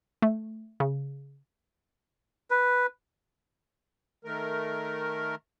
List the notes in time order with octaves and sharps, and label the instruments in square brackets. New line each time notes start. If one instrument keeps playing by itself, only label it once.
[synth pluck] A3
C#3
[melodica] B4
[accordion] D#3 A3 A#4